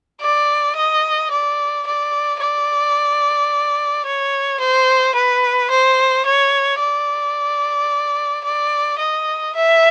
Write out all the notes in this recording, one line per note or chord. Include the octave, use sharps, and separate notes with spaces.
D5
D#5
D5
D5
D5
C#5
C5
B4
C5
C#5
D5
D5
D#5
E5